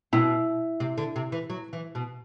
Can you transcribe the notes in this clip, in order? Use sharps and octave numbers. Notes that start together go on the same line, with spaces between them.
B2 E4
C3
D3
C3
E3
F#3
E3
B2